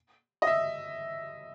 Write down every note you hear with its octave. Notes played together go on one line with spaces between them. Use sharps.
D#5
E5